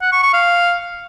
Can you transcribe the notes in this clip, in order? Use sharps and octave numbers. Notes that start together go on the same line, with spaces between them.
F#5
C#6
C#6
F5